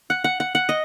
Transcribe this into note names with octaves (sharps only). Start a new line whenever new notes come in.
F#5
F#5
F#5
F#5
D#5